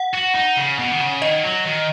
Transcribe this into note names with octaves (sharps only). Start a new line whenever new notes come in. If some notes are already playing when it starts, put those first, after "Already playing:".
Already playing: F#5
F#4
D#4
C#3
B2
D#3
C#3
D#3 D#5
F#3
D#3